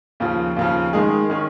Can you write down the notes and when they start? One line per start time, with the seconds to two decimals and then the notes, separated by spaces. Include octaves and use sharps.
0.20 D#2 C#3 F3
0.57 D#2 C#3 F3
0.93 D#3 G#3 D#4 G#4
1.30 D#3 C#4 G#4